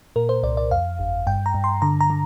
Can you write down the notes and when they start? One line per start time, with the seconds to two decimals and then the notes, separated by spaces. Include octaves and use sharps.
0.16 A#2 A#4
0.29 C5
0.43 C2 D5
0.57 D5
0.71 F2 F5
0.99 G1
1.27 G2 G5
1.46 A#5
1.54 G2
1.64 C6
1.82 D3 A#5
2.01 A#5
2.10 D3